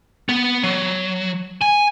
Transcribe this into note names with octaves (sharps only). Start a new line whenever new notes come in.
B3
F#3
G#5